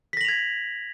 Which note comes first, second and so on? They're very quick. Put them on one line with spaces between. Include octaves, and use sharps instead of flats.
B6 A#6 F#7 F7 G#6